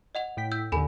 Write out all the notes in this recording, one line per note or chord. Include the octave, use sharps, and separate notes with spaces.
D#5 F#5 F7
A2 G5 B6
E6 G6
D#2 D3 A4 G#5 B5